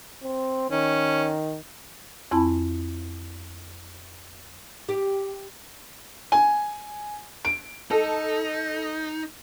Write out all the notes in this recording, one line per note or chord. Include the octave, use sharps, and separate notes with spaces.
C4
D#3 C#4
F2 C4 E4 G#5 A5 B5
G4
G#5
D7
D#4 A4